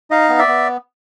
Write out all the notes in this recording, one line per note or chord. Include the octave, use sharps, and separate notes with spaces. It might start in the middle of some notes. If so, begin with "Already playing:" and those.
D#4 D#5 F5
B3
D5 E5
B3